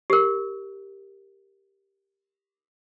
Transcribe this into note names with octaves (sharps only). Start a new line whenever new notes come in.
G4 A#4